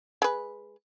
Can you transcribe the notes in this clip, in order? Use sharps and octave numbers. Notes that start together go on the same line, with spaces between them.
G#3 B4